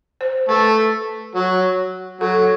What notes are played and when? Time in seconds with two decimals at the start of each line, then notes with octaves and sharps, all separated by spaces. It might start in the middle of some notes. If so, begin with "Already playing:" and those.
0.21 C5
0.49 A3 B4
1.35 F#3
2.21 F#3 A4